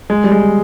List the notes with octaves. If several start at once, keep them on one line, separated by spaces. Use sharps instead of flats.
G#3
G3
G#3